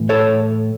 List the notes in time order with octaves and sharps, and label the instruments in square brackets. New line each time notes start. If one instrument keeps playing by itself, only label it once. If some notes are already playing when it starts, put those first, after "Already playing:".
Already playing: [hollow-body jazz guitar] A2 E3
A4 C#5